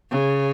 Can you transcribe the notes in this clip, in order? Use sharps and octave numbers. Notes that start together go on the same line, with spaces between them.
C#3